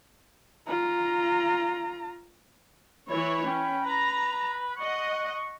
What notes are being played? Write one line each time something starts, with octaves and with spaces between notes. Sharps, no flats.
F4 A#5
E3 E4 C#5 B5
C#4 G5
B4 A#5
D#5 F#5 C#6